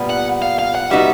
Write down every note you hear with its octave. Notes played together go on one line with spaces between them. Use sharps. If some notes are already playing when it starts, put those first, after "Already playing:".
Already playing: A#2 G3 B3
F#5
F5
F5
F#5
G3 B3 D#4 F#4 E5